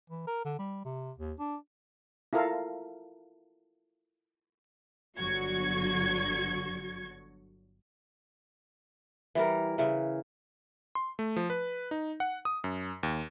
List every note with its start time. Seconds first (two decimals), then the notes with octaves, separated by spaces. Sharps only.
0.10 E3
0.27 A#4
0.45 D3
0.59 G3
0.85 C3
1.18 D#2
1.40 D4
2.33 E4 F4 A4 A#4 F5
5.17 G1 D3 F#3 F#4 C#6 G#6
9.35 E3 G3 A#4
9.78 C#3 E3
10.95 C6
11.19 A3
11.36 F3
11.50 B4
11.91 D#4
12.20 F#5
12.45 D#6
12.64 F#2
13.03 D#2